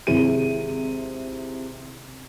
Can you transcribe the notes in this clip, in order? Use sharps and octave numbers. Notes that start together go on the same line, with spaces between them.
G#1 C3 E4 G#4 D#7